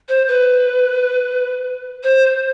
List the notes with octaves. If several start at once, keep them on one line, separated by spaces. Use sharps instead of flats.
C5
B4
C5